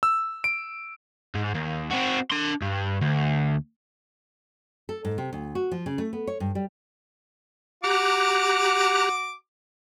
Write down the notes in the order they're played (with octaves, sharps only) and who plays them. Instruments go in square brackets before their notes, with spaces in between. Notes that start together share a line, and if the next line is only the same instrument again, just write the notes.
[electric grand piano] E6
D7
[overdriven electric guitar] G#2
D#2
C4 F#4
D4 C6
G2
D2
[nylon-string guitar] A4
G#2
C3
D2
F#4
F3
C#3
A3
B3
C#5
G2
G3
[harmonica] F#4 D6 [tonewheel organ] G4 A#5 F#6